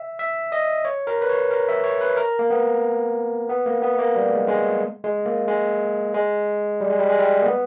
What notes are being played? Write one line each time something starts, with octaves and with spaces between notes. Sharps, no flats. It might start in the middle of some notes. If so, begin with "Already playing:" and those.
Already playing: E5
E5
D#5
C#5
A#4
B4
C#5
A#4
E5
C#5
B4
A#4
A#3
B3
B3
A#3
B3
A#3
G3
G#3
G#3
G#3
A#3
G#3
G#3
G3
G#3
G3
G#3
G3
A#3
B3